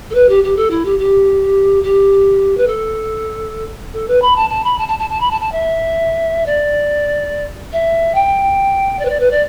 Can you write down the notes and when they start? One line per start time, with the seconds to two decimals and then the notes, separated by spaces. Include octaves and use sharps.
0.10 A4
0.14 B4
0.29 G4
0.43 G4
0.56 A4
0.70 E4
0.85 G4
0.98 G4
1.83 G4
2.57 B4
2.67 A4
3.93 A4
4.08 B4
4.21 B5
4.36 A5
4.50 A5
4.64 B5
4.78 A5
4.88 A5
4.99 A5
5.09 A5
5.20 B5
5.30 A5
5.40 A5
5.51 E5
6.46 D5
7.72 E5
8.14 G5
8.99 D5
9.05 B4
9.09 D5
9.19 B4
9.31 D5